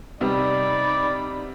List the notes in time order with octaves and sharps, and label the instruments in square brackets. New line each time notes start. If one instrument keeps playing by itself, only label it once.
[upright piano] C3 G3 B3 [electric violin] D#4 B5 [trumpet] D5